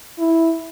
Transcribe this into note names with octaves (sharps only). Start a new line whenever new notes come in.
E4